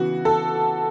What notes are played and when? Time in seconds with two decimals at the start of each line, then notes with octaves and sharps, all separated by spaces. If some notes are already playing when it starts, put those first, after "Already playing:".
Already playing: C#3 E3 B3 F#4
0.25 A4